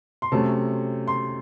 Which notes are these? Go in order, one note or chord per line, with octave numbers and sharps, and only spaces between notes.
C6
C3 F#3 A3 C#4 A5
C6